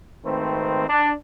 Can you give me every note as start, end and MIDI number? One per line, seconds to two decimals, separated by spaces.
0.24 0.84 32
0.24 0.84 51
0.24 0.84 57
0.24 0.84 60
0.24 0.84 71
0.24 0.84 72
0.88 1.12 62